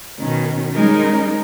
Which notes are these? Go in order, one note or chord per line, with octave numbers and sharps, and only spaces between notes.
B2 D#3 C#4
G3 G#3 C#4 D#4 A#4